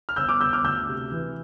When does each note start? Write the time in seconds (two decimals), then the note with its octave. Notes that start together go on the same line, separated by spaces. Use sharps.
0.09 F6
0.16 G1 E6 G6
0.29 D6 F6
0.40 G1 E6 G6
0.53 D6 F6
0.64 D2 E6 G6
0.89 C3
1.12 E3